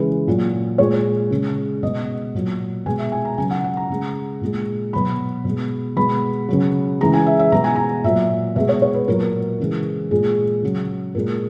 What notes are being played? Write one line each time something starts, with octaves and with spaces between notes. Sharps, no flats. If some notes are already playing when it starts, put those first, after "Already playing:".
Already playing: C#3 E3 G#3 B4
A#2 F#3
A#2 G#3 C#5
C#3 G#3
B2 G#3 D#5
A#2 F#3
B2 G#3 G#5
E5
G#5
A#5
C#3 F#3 G#5
F#5
F#5
A#5
C#3 G#3
A#2 G#3
B2 F#3 B5
B2 G#3
B2 G#3 B5
C#3 F#3
C#3 E3 G#3 A#5
G#5
E5
E5
B2 G#3 A#5
G#5
A#5
A#2 F#3 E5
B2 G#3 E5
C#5
C#5
B4
A#2 F#3 A#4
C#3 E3 G#3
A#2 G#3 G#4
C#3 F#3
A#2 G#3 A#4